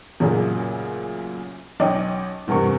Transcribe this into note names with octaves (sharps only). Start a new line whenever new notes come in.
A1 F#2 A#2 C#3 G#4
B1 C#4 D#5 G5 D6
E2 G2 C3 A#4 C#6